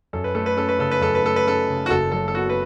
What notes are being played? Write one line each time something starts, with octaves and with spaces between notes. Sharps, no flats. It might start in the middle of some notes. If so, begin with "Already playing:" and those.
F#2 A4
B4
A3 A4
B4
C#4 A4
B4
C#3 A4
B4
F#2 A4
B4
A3 A4
B4
C#4 A4
C#3
F#4
F#1 A4
F#3 A4
A4
B3 F#4
B4